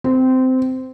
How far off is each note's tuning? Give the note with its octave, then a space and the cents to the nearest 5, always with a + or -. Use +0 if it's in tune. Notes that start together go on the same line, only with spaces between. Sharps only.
C4 -15